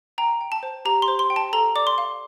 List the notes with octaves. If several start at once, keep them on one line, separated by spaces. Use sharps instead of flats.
G5 A#5
G5
A5
C5
G4 A#5
C6
C5
C6
G5
A5
A4 A#5
D5 D6
C6
F5